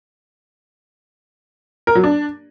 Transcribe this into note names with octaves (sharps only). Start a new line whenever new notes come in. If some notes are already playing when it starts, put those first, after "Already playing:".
A#4
F#3
D4